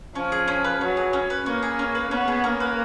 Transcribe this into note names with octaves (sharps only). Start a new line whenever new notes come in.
F3 C#4
G#4
C#4
B4
F#3 C#4
G#4
C#4
B4
A#3 C#4
G#4
C#4
B4
B3 C#4
G#4
A#3 C#4
B4